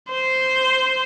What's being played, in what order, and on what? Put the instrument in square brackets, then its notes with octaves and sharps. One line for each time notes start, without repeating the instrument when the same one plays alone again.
[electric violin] C5